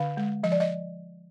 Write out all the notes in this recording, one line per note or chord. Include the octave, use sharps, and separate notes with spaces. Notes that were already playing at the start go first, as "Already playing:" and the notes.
Already playing: D3 F5
G#3
F3 D#5
D5
D#5